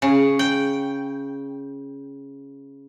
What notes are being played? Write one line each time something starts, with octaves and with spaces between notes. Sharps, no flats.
C#3
G5